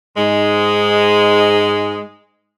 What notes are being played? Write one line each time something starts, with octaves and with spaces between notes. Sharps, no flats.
G#2 G#3